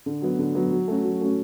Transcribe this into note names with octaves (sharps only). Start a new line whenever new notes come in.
D3
F#3 B3
D3
F#3 B3
F#3
A3 C#4 F#4
F#3
A3 C#4 F#4